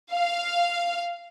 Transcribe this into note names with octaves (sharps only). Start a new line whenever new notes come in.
F5